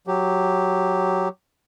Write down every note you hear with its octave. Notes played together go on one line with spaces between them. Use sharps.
F#3 G4